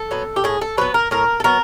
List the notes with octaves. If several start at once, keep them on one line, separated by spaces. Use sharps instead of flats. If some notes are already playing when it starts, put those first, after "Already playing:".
Already playing: A4
F#3 B3
G4
A2 G#4
A4
F#3 B3 B4
A#4
A2 A#4
A4
F#3 B3 A#4